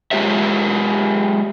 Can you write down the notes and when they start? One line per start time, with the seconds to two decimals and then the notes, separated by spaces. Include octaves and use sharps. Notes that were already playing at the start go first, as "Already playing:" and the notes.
0.11 G#3 F4 G4 C#5 E5